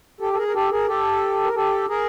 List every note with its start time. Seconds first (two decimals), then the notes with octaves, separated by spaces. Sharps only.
0.20 G4 A4
0.33 A4
0.37 G#4 A#4
0.48 A#4
0.54 G4 A4
0.71 G#4 A#4
0.88 G4 A4
1.44 A#4
1.55 G4 A4
1.89 G#4 A#4